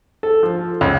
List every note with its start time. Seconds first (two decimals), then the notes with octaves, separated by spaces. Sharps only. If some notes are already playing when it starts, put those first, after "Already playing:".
0.23 A4
0.43 F3
0.81 C#2